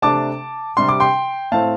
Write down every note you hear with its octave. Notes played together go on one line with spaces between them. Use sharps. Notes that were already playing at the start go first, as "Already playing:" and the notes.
C3 A3 D4 A5 D6
C3 G3 D4 C6
D6
G5 C6
A2 A3 C4 F5 A5